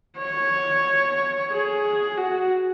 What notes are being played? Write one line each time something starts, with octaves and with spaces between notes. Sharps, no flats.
C#5
G#4
F#4